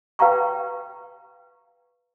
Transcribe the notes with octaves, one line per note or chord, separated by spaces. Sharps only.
B4 F5 G5 A#5 C#6